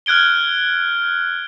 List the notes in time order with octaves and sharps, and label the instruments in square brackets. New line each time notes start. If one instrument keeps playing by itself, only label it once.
[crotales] F6 F#6 G#6 D7 G7